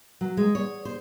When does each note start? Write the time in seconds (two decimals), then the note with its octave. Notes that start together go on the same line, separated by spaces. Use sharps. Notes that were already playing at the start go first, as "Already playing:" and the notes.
0.21 F#3
0.37 G#3
0.55 C#5
0.85 C5